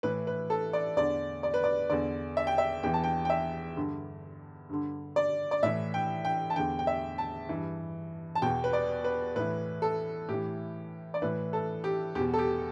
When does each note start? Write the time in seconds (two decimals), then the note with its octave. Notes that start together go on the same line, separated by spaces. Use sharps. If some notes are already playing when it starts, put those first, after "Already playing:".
0.03 A2 E3 B4
0.27 B4
0.50 A4
0.73 D5
0.97 E2 D3 D5
1.43 D5
1.54 B4
1.64 D5
1.90 E2 D3 D5
2.37 E5
2.47 G5
2.58 E5
2.83 E2 E3 G5
2.94 A5
3.04 G5
3.25 G5
3.30 E5
3.77 G2 D3
4.69 G2 D3
5.16 D5
5.51 D5
5.63 A2 E3 E5
5.94 G5
6.25 G5
6.50 A5
6.56 E2 D3 G5
6.79 G5
6.87 E5
7.18 A5
7.49 G2 E3
8.35 A5
8.42 E2 B2 G5
8.64 B4
8.73 D5
9.04 B4
9.36 A2 E3 B4
9.82 A4
10.29 A2 E3 G4
11.14 D5
11.22 A2 E3 B4
11.53 A4
11.84 G4
12.15 E2 G4
12.19 B2
12.34 A4
12.38 G4